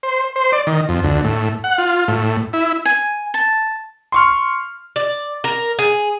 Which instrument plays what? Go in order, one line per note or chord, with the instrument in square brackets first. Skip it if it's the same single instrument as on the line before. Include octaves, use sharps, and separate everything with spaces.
[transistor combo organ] C5
C5
D5
D#3
F2
D2
A2
F#5
F4
A2
E4
[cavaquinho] G#5
A5
[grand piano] C6 C#6 F6
[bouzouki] D5
A#4
G#4